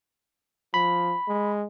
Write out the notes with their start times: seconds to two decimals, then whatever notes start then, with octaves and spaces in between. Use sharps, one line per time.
0.74 F3 B5
1.28 G#3